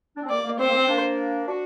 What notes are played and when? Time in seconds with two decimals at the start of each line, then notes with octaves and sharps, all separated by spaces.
0.16 D4
0.23 C4
0.30 A#3 D5
0.44 A#3
0.59 C4 C5
0.68 A#3
0.73 C4
0.88 A#3 D4
1.46 D4 F#4